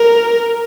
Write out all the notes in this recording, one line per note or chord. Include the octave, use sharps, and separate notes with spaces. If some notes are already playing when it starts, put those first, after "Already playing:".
Already playing: A#4